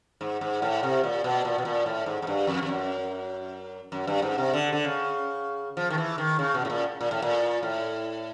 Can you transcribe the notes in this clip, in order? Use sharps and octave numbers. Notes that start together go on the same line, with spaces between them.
G#2
G#2
A2
C3
A#2
B2
A#2
B2
A#2
A2
G#2
G#2
G2
F2
F2
F#2
F#2
G2
G#2
C3
D3
D3
C#3
F3
D#3
E3
D#3
C#3
B2
A2
A#2
A#2
A2
A#2
A2